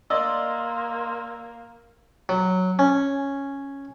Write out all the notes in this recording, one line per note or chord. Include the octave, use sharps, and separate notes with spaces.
A#3 D5 D#5 C6 E6
F#3
C#4